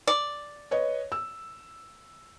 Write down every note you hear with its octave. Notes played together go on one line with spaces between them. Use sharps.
D5
B4 C#5 D#5
E6